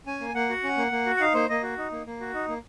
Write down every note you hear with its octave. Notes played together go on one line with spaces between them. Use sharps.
C#4 G#5
A#3
A#3 F#5
F#4
C#4
A#3
A#3
F#4
F#5
D#4 F5
A#3 C5
A#3 D#5
F#4
D#4
A#3
A#3
F#4
D#4
A#3